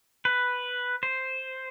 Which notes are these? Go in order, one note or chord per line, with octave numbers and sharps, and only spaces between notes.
B4
C5